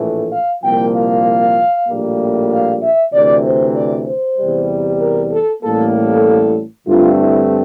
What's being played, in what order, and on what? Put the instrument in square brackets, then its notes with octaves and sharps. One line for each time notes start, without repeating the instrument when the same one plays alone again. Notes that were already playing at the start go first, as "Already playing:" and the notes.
Already playing: [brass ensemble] A#1 A2 E3 A3
F5
C2 A#2 F3 A#3 G5
F5
A#1 A2 G3 A#3
F5
E5
D2 C3 E3 D5
C5
D5
C5
E2 C3 G3
A#4
A4
A1 A2 G3 A#3 A4
A4
G2 D3 A3 C4 F4
E4